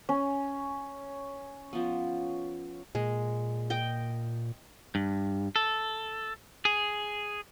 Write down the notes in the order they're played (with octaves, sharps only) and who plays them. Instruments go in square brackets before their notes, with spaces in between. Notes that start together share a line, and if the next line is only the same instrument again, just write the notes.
[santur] C#4
[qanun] F3 B3
[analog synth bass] A#2 [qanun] G#3
[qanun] D#5 G5
[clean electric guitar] G2
A4
G#4